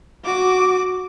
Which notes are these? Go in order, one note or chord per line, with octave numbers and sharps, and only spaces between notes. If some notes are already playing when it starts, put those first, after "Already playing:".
F#4 D6